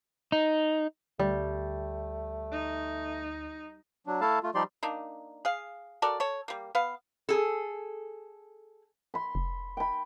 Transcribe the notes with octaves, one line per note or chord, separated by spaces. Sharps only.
D#4
D2 G3 A3
D#4
F#3 D4
A3 E4 A4 F5 A5
A3 F4
F3 G3 D#4 G4 D5 C6
A#3 D4 D#4
G#4 F5
F#4 A4 A#4 D5
A4 C#5
G3 A#3
B3 F5
G#4 A4
B5 C6
F1
G5 B5